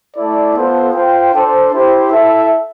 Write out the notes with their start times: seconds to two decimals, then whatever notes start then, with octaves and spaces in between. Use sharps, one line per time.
0.16 A3 E4 A4 D5
0.55 B3 F4 A4 C5
0.93 F4 C5 G5
1.33 D4 A4 C5
1.72 E4 G4 C5
2.12 E4 A4 E5